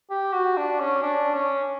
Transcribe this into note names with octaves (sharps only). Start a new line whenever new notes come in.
G4
F#4
D4
C#4
D4
C#4